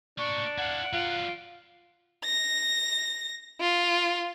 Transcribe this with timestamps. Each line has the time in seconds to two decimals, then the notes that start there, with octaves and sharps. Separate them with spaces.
0.18 A#3 D4 D5 C#6
0.58 E4 F5 F#5
0.93 F#3 F4 D5
2.25 A#6
3.61 F4